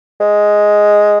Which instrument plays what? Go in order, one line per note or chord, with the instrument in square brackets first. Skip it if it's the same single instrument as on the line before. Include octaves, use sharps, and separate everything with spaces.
[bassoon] G#3